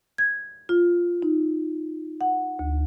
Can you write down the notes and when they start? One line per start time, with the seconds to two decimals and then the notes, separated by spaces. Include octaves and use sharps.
0.18 G#6
0.69 F4
1.22 D#4
2.21 F#5
2.59 D2